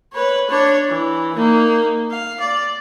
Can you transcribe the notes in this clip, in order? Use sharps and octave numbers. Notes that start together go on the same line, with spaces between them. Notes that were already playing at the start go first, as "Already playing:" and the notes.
B4 C#5
D4 C#5
E3
A#3 D#4
F5
D5